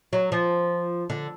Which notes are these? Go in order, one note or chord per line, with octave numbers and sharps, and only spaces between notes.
F#3
F3
D3